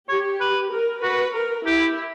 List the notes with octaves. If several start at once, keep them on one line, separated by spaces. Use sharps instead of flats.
G4 C#5
B4
A#4
F#4 B4
A#4
E4 G4